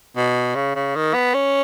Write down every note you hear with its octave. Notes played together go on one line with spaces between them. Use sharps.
B2
C#3
C#3
D#3
B3
C#4